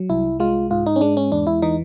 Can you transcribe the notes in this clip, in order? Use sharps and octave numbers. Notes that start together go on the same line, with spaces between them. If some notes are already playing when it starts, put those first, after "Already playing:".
Already playing: F#3
C2 E4
G#3 F4
G#2 F4
D#4
C#4
G#3 D4
C#4
E2 D4
E4
E3 D#4